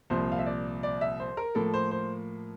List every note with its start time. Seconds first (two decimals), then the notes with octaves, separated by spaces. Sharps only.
0.10 C2 A#2 F3 C5
0.32 F5
0.39 E5
0.46 D5
0.83 D5
1.01 E5
1.20 C5
1.37 A#4
1.55 A2 F3 A#3 A4
1.74 C5
1.91 C5